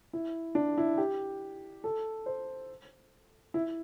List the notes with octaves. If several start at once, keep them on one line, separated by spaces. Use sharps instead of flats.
E4
D4
E4
G4
A4
C5
E4